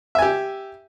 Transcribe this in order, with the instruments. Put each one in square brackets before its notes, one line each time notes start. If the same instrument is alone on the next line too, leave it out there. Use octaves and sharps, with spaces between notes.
[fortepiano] E5
G#5
G4